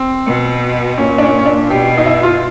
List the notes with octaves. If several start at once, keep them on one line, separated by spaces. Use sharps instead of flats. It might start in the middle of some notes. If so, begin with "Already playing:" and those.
Already playing: C4
B2
A#2 C#4
D4
C#4
C#4
D4
B2 G4
D#4
E4
F4